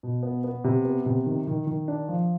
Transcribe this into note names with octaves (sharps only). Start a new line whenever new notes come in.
B2
B3
B3
C3
B3
C3
D#3
D#3
D#3
D4
F3